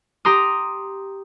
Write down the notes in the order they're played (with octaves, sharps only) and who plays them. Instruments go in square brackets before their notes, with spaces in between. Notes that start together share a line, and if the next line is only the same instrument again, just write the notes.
[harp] G4 A#5 C6 D#6